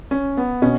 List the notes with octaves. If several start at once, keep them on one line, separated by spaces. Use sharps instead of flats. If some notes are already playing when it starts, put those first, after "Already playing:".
C#4
B3
B2 C#4